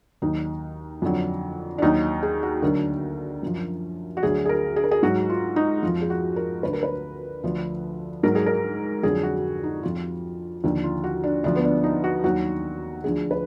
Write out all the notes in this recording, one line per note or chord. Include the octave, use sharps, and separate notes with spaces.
D#2 D#3 F#3 D#4
F2 D3 F#3
D4
D#2 D#3 F#3 D#4
G#4
F#4
D2 D3 F#3 A#4
F#2 F3
F#4
D2 D3 F#3 G#4
G#4
A#4
G#4
A#4
G#4
G#2 F#3 F#4
F4
D#4
F2 F3 F4
G#4
F#4
A#4
D2 D3 F#3 B4
A#4
B4
D2 D3 F3
G#2 F#3 A#4
G#4
A#4
F2 D3 F#3 G#4
F#4
D#4
F2 F3 F4
D#2 D3 F3
F4
F#4
D4
D2 D3 F3 D4
B3
D4
D#4
F#4
D#2 D#3 F#3 F#4
D2 D3 F3 G#4
B4